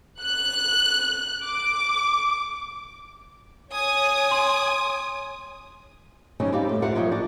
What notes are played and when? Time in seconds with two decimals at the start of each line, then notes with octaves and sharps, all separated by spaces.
0.22 F#6
1.45 D6
3.71 C#5 G#5 D#6
4.31 C6
6.40 C#3 F#3 G3 C4 C#4 D#4
6.52 G3 C4 D#4 G4 D5 F5
6.69 A2
6.82 F4 G4 A#4 C5 E5 F#5
6.95 A#2 F3 F#3 D#5 E5 G5
7.11 D4 F#4 D5